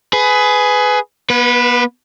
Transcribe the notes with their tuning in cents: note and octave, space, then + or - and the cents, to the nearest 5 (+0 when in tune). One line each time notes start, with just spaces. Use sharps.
G#4 +15 B4 +15
B3 -40 B4 +0